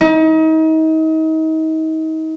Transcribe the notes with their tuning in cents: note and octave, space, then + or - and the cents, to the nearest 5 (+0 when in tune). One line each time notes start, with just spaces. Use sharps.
D#4 +35